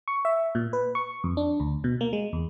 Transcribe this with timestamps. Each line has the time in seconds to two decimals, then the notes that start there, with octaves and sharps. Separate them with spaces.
0.08 C#6
0.25 E5
0.55 A#2
0.73 B4
0.95 C#6
1.24 F2
1.37 D4
1.60 D2
1.84 B2
2.01 A#3
2.13 G#3
2.33 E2